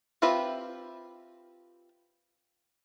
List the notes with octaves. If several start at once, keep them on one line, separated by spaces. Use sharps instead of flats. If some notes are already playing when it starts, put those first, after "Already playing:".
C4 F4 G4 B4 E5